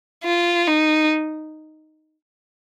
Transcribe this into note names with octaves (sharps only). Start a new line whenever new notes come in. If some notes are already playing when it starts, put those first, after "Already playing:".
F4
D#4